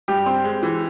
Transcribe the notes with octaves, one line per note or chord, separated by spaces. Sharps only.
G2 G4
C4
G#3
E3